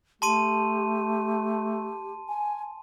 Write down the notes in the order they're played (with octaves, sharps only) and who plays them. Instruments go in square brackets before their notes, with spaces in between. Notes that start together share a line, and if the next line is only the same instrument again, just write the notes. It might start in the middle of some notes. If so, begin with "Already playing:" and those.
[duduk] A3 [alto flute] G4 [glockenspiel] A5 C6 D#7
[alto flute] G#5